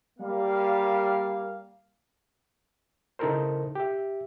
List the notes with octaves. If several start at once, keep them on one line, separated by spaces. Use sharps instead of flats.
G3 A#3 F5
C#3 D#4 E4 A4 A#4 C5
G4 E5